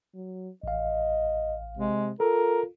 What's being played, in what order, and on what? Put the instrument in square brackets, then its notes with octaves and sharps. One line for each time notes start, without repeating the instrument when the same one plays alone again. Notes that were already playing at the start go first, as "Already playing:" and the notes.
[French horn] F#3
[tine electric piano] A1 F5 [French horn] D#5
[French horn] C3 [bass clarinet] G#3
[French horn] F4 [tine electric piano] A4 [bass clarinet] A#4